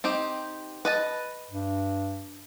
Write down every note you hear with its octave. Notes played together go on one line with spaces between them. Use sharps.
C4 D#4 G4
B4 D#5 A5
G2